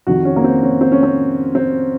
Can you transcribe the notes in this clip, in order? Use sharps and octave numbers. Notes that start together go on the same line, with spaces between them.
F2 C3 D#3 F#4
C#4
A#3
C4
C#4
C4
C#4
C4
C4